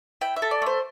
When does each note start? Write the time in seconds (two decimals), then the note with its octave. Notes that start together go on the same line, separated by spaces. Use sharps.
0.21 E4 G5
0.36 E5
0.42 A4
0.51 D5
0.62 A3 C5